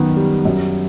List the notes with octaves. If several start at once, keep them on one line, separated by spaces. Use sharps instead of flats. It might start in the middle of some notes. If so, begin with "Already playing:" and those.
Already playing: F#2 D#3 B3
G3
F#2